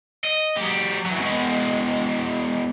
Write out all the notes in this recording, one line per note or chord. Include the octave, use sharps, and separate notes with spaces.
D#5
F#3 G4
E3 F#3
B2 G#3